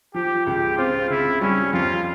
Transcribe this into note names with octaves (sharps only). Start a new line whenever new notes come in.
F3 G4
C#2 G4
C4 F4
C#3 E4
G3 C#4
F2 F4